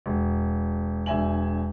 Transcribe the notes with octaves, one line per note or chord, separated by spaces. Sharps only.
E1
E1 D4 E5 G#5 F#7